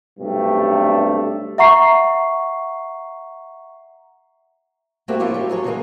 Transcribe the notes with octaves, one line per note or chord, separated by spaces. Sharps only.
B1 G2 C3 A3 D4 G4
E5 F#5 A#5 C#6 C7
G3 A3 A#3 C4 F#4 G4
F3 C#4 E4 F4 C#5 D5
G3 F#4
F#3 G#3 G#4 A4 C5 C#5
C#3 E3 F#3 G#3 A#3 G#4